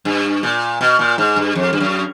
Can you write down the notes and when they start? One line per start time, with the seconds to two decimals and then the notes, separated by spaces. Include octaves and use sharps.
0.05 G2
0.43 A#2
0.81 B2
0.99 A#2
1.18 G#2
1.36 G2
1.55 F2
1.73 G2
1.80 F#2